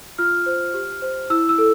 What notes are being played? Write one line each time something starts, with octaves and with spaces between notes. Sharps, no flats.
F4 F6
C5
G4
C5
E4 E6
E6
A4